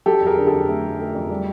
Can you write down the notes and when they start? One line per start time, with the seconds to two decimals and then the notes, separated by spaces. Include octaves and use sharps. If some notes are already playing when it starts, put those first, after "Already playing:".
0.06 F#3 G4 A4
0.21 F2
0.27 G#4 A#4
0.37 D3
0.47 G4 A4
0.52 F2
0.68 A3
0.84 F#3
0.99 A3
1.15 F2
1.30 G3